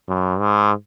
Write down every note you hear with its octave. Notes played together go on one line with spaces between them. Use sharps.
F#2
G#2